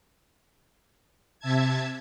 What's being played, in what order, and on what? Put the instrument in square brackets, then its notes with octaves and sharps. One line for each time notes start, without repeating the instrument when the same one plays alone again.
[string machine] C3 E5 A5 G#6